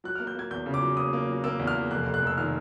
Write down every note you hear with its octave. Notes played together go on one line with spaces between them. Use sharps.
F#3 F#6
A#3 F6
G6
A#3 G#6
E2 G6
C#3
D6
F#3
A#3 D#6
A#3
F#3
A#3 E6
E2
F6
A#3
F1 F#6
F1
F#6
F1 E6
D#3 F6